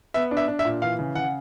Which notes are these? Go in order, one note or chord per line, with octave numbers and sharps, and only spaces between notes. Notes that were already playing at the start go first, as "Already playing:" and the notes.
B3 E5
D4
E5
D4
E5
A#2
E3 F5
C#3
C#3 F#5